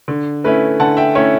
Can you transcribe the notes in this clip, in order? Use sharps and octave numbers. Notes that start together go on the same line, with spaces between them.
D3
A3 C#4 E4 B4
D3 F#5 A5
E5 G5
A3 C#4 E4 C#5 E5